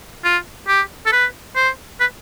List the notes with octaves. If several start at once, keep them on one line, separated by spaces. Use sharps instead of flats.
F4
G4
A4
B4
C5
B4